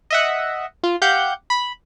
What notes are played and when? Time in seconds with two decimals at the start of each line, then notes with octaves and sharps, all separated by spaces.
0.10 D#5 E5 F#5
0.83 F4
1.02 G4 F5 F#5 G6
1.50 B5